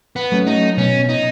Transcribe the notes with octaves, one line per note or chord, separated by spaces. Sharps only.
B3
F#3 A3 C#4
D#4
B2 C#4
D#4